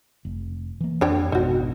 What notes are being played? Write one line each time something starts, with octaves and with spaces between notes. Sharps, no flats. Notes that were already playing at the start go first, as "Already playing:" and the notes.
F1
E3 A#3
F2 D4 C#5 G5
G#1 F2 B2 D#4 F#4